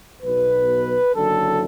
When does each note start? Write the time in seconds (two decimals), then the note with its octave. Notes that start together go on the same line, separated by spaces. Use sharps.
0.22 B1 B2 F#3 B4
1.14 F#1 F#2 D3 A4